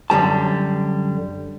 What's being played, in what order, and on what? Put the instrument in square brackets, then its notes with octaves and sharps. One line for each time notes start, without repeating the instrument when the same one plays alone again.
[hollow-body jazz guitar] F#2 D3 G3 A5